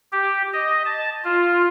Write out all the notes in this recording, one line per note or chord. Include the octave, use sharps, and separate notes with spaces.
G4
D#5
A5
F4